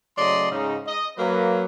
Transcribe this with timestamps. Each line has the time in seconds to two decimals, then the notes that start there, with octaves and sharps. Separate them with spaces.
0.17 C#3 F#3 A3 D5 D#5 C6
0.51 G#2 C#3 D#4
0.87 D#5
1.18 F#3 A#3 B4